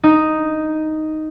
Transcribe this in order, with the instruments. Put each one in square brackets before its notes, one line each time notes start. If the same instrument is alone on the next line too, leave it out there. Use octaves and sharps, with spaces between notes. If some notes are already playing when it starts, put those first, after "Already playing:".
[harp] D#4